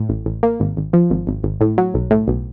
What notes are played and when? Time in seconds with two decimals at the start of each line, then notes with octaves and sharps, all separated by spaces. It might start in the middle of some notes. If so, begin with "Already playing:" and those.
Already playing: A2
0.09 A1
0.26 A1
0.43 A#3
0.60 G#1
0.77 G#1
0.93 F3
1.10 G#1
1.27 G#1
1.44 G#1
1.61 A2
1.78 F#3
1.94 B1
2.11 A2
2.28 B1